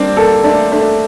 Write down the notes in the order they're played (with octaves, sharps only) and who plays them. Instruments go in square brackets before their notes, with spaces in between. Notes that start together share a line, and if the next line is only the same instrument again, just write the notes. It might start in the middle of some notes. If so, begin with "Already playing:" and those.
Already playing: [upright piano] G3 D4 [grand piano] A#3 C4
[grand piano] A#3 [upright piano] A4
[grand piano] A3 [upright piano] D4
[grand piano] A3 [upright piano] D4